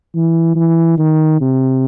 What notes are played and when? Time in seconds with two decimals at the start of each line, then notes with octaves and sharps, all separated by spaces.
0.15 E3
0.56 E3
0.98 D#3
1.41 C3